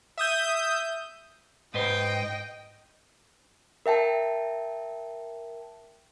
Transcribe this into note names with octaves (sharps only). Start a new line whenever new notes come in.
E5 D#6 G6
G#2 B4 C5 D#5 G5
A#4 E5 G5 A5